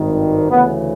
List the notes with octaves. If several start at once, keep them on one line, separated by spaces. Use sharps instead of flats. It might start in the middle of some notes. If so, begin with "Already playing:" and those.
Already playing: G#1 G2 D#3
D2 C#3 E3 B3